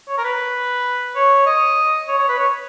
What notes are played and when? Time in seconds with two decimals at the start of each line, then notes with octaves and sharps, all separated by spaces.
0.08 C#5
0.18 A#4
0.24 B4
1.16 C#5
1.46 D#5
2.08 C#5
2.19 C#5
2.29 B4
2.38 C#5